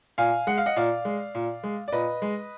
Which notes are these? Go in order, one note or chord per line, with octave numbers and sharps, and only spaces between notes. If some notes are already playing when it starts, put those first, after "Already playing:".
A#2 F5 G#5
G#3 F#5
F5
D#5 F#5
A#2 D5 F5
G#3
A#2
G#3
D5
A#2 B4 D#5
G#3